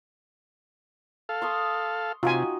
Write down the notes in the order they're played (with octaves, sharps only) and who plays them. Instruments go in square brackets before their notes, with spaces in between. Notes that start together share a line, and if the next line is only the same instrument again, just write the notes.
[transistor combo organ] A4 F5
[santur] C6 C#6 D#6
[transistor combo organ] C3 [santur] D#4 F#4 G5 [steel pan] F4 G#5